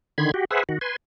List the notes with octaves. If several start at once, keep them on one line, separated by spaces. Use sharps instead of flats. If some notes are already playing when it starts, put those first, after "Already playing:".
D3 D#3 B5 C6 G#6
F#4 G4
G#4 B4 C5 E5 F#5
D#3 F#4
B4 G#5 C6